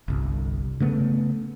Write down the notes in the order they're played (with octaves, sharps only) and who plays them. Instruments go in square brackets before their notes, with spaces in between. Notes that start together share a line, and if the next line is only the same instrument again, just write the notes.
[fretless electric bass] G1 C2
C#3 A3 B3